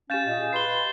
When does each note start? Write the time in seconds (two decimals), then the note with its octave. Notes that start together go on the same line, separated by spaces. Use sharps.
0.10 C#4 G4 F5 G6 A6 E7
0.26 A#2 D#5
0.40 G#4
0.53 B4 C6 C7 G7